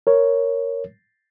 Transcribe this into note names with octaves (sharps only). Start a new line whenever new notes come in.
A#4 C#5